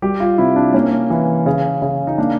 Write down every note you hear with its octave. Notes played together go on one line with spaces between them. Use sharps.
G3 G4
F4
C3 E4
D4
A#3 C#4
E3
C#3
C#3
D#4
A#3 D4